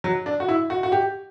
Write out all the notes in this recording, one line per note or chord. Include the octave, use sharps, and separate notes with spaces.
F#3
D4
F#4
E4
F#4
F#4
G4